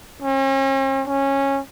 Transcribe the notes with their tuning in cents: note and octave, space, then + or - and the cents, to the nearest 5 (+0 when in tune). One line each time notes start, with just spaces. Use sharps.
C#4 -45
C#4 -15